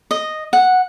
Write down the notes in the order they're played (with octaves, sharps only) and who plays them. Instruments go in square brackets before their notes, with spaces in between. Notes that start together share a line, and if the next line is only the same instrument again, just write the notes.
[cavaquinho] D#5
F#5